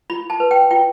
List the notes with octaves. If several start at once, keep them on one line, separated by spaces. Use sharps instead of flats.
F4 B5
A5
B4
G5
F4 G5